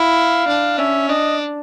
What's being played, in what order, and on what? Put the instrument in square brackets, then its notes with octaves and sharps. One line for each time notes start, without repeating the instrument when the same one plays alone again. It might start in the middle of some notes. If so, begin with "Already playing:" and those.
Already playing: [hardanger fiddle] E4 [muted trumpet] F5
[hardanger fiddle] D4
[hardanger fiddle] C#4 [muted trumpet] E5
[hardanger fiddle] D4 [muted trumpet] D#5